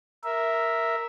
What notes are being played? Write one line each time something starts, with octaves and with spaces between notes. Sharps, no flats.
A#4 E5